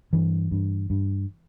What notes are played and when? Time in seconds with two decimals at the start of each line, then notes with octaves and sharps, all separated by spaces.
0.13 G2 E3
0.51 G2
0.90 G2